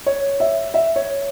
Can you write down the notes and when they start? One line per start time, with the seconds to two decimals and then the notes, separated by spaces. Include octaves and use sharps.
0.06 C#5
0.40 E5
0.74 E5
0.96 C#5